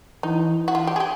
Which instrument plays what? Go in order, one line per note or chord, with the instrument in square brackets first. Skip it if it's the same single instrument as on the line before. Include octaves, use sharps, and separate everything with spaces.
[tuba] E3 [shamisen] D#4
[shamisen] F#4
F4
G4
G#4
G4